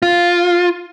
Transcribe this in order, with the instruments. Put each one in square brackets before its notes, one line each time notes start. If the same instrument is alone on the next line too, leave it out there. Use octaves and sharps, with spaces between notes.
[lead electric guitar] F4